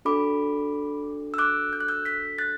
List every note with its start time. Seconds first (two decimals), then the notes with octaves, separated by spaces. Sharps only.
0.05 D4 F#4 A4 B5 D6
1.34 E6
1.38 D6 F#6
1.73 G6
1.80 F#6
1.88 E6 G6
2.05 G6 B6
2.38 F#6 A6